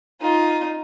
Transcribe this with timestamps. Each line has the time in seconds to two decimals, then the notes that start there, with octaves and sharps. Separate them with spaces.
0.21 D#4 F4